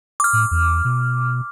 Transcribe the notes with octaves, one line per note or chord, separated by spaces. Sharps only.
D6 F6
A2
E2
B2